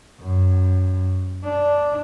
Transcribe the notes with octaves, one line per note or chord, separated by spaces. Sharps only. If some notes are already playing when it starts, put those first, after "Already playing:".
F#2
D4